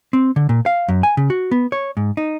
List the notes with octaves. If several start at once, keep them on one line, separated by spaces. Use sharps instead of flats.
C4
D3
A#2
F5
F#2
G#5
C#3
F#4
B3
C#5
G#2
D#4